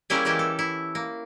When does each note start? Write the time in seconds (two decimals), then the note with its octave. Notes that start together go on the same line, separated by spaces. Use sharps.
0.10 G3 A#3 C#4 E4 G4 G#4
0.25 E3 G3 G#3 E4 G4
0.39 A4
0.59 E4
0.95 A#3